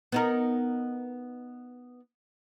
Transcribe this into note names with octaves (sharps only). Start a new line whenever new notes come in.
B3 D#4 A#4